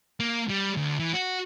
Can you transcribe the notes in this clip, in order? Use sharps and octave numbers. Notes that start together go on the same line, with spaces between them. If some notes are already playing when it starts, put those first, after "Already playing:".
A#3
G3
D2
E3
F#4